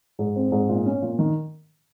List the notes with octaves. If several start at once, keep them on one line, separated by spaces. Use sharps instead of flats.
G#2
C4
G#2
A#2
C#4
A#2
D#3